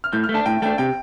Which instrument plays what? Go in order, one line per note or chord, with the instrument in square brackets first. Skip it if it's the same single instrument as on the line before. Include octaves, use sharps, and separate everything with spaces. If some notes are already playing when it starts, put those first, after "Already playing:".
[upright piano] F6
[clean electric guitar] A2 [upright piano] G6
[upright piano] F6
[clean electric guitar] A3
[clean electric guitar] D4 [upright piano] A5
[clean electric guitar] A2 [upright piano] G5
[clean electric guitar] A3 D4 [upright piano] G5
[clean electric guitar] C3 [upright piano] G5